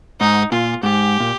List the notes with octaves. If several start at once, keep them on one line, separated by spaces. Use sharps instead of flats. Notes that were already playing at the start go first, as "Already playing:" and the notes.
G#2 D#4
A#2 F4
G#2 G4
A#2